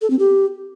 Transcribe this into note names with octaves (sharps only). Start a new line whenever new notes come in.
A4
C4
G4